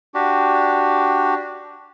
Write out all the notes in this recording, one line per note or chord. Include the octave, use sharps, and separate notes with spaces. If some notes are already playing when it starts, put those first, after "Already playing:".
D4 F#4 G4